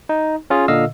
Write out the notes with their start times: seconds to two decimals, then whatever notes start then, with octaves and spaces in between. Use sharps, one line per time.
0.09 D#4
0.50 C#4 F4 G#4
0.68 A#2 D3 D#5 F5 E6